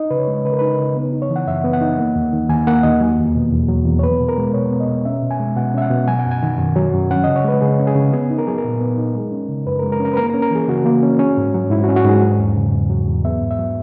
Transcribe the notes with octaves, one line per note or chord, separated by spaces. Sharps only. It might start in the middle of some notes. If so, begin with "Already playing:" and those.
Already playing: D#4 D#5
C#3 B4
C#5
G#3
C#3 B4
A#4
D#4 B4
C#3
B3
D#4
C#5
E3
F#5
F#2 E5
B3
F#5
D#4
A#3
D#2
D#3
D#2 G#5
A#3 F#5
D#2 D#5
F#3
E2
B2
E2
F#3
E2
C#5
B3 B4
B2
A#4
G#3
B2 C#5
B3
D#5
B2
C#4 E5
B2
G#5
G#3
B2 F#5
C#4 E5
F#5
B2
F#3 G#5
F#5
F#2
G#5
D#3
F#2
F#3
F#2
C#4 F#5
C#3 D#5
C#5
G#3 B4
C#3 G#4
C#4
G#4
C#3
B3 G#4
D#4
A#4
F#3 G#4
A#4
A#2
B3
D#4
G#3
C#4
C#3
F#2 B4
A#4
G#3
A#4
C#4
A#4
B4
A#3 A#4
A#4
C#4
A#4
E3 G#4
C#3 F#4
A#3
C#4
C#4
G#2
F#3
G#2 E4
F#4
C#4
F#4
G#2 G#4
F#3
E2
C#3
E2
F#3
E2
B3 E5
G#2
E5
F#3